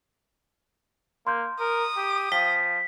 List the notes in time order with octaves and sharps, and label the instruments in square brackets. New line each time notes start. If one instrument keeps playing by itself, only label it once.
[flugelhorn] A#3 [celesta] C6 F6 G6
[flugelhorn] A#4 [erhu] D#6
[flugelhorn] G4
[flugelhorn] F3 [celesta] F5 G5 G7 [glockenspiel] B6